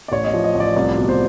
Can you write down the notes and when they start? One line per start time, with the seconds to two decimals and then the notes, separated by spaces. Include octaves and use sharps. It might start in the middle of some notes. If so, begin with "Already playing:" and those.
0.08 D5
0.12 A1 C#5
0.24 D#5
0.28 D5
0.33 F3
0.44 D#5
0.55 A1 D5
0.76 C2 D5
0.98 B2
1.09 C5